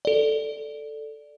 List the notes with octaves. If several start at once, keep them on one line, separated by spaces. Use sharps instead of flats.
A4 D5